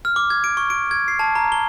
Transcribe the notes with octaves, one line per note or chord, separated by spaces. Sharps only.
F6
D6
G#6
D7
C#6
D7
G#6
C7
A5
A#5
G7